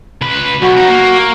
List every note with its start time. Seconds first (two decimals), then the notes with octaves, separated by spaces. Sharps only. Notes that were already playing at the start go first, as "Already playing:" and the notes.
0.21 C#2 B4
0.62 B1 F#4
0.77 C#2 D#4
0.89 A#3